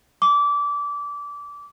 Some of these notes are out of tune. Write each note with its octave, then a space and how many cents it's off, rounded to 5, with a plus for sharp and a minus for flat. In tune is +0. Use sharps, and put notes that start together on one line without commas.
D6 -25